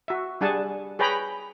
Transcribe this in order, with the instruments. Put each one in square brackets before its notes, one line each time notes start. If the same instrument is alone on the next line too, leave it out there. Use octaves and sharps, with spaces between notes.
[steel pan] F#4 E5
G3 D4 G#4 F#5 G#5 A5
G#4 B4 C#5 G5 A#5 B5